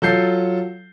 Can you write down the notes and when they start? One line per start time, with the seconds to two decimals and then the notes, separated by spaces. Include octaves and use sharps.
0.02 F#3 F4 A4 G6 C7